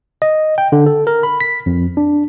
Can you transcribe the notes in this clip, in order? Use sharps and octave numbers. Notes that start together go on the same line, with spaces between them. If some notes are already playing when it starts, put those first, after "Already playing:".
D#5
G5
D3
A4
A#4
B5
B6
F2
D4